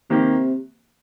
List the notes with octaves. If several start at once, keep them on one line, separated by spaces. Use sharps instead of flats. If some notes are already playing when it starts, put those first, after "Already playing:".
C3 D#3 A#3 G4